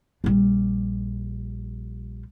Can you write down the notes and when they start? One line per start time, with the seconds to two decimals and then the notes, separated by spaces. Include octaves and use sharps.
0.24 A#1 G3